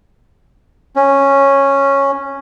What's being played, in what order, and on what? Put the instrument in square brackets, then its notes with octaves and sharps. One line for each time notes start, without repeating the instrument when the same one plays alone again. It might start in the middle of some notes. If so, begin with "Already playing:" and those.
[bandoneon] C#4